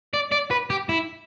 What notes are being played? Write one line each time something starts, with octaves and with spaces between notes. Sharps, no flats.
D5
D5
B4
G4
E4